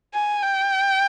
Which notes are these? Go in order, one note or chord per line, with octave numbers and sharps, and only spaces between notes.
G#5
G5